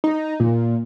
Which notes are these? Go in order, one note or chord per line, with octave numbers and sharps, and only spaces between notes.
D#4
A#2